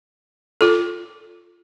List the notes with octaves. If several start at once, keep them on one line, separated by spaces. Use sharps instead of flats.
F4 A4